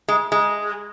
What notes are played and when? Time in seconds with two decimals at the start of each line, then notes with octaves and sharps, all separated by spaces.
0.08 G#3
0.32 G#3